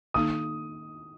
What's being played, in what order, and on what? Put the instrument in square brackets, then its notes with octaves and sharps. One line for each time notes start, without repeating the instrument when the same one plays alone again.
[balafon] D#3 A#3 D#4 [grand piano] D#6